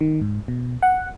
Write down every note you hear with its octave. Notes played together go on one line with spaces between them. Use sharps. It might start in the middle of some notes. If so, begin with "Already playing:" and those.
D#3
G#2
B2
F#5